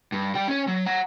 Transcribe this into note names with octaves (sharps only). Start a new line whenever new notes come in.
G2
G3 G5
C#4 C#5
F#3
F#5 A#5